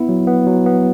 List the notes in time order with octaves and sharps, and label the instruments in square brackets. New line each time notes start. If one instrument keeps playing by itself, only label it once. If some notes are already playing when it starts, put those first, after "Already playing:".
Already playing: [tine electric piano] B3 E4
F#3
B3
F#3
B3